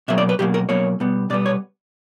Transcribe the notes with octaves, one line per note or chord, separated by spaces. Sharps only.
B2 F#3 A#3 E5
D5
B4
B2 F#3 A#3 G4
A#4
B2 F#3 A#3 C#5
B2 G3 B3
B2 G3 B3 D5
C#5